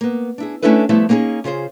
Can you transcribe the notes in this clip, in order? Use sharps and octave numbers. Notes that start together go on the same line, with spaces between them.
A#3 B3
D4 E4 G#4
A3 C#4 D4 E4 A4 B4
F3 G3 A3 B3 E4
A#3 B3 C#4 D#4 G#4
C#3 F4 G#4 C5